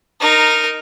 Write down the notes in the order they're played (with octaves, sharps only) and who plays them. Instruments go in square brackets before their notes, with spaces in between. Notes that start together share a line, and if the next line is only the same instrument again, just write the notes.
[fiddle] D#4 A#4